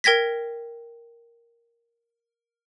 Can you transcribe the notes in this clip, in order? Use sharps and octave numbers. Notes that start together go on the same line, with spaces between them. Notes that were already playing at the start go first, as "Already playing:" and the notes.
A#4 G5 G#6 A#6 B6